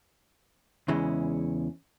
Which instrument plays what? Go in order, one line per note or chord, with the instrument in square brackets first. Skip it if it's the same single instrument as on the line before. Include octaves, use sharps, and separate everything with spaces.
[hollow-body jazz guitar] E2 C#3 E3 G#3 C#4